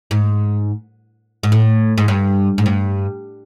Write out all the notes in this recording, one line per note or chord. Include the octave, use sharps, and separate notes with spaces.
G#2
G#2
A2
G#2
G2
G#2
G2